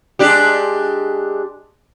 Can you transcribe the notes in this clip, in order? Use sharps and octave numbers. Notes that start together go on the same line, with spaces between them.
G#3 D4 G4